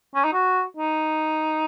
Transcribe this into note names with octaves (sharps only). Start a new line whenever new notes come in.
C#4
D#4
F#4
D#4